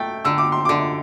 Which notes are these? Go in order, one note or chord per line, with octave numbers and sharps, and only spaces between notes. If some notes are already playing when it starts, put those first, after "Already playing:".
Already playing: A3 G5
D3 E6
D6
C6
D3 D6